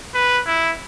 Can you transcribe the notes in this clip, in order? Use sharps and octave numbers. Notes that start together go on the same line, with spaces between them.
B4
E4